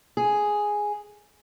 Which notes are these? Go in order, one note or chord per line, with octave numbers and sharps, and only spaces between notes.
G#4